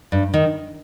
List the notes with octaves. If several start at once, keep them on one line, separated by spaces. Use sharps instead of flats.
G2
D#3